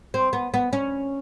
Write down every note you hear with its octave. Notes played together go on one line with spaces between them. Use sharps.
C4
B3
B3
C#4